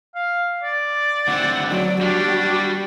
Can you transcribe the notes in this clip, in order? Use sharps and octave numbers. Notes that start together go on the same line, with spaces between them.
F5
D5
D2 C4 F#5
F#3 D5
G3 D4 F#4 G4